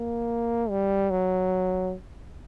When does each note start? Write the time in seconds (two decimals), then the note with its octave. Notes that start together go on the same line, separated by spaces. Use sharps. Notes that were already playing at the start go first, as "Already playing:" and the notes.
Already playing: A#3
0.70 G3
1.10 F#3